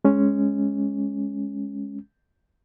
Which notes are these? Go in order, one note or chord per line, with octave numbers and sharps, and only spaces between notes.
G#3 C#4